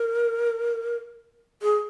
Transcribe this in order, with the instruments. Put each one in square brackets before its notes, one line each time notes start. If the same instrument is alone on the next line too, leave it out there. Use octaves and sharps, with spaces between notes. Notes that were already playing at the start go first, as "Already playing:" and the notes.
Already playing: [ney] A#4
G#4